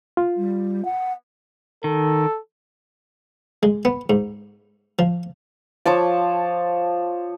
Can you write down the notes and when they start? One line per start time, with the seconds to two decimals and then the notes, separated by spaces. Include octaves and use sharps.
0.17 F4
0.37 G3
0.85 F#5
1.84 D#3 A4
3.63 G#3
3.85 B3
4.10 G#2
4.99 F3
5.86 F3 C#5 A5 D6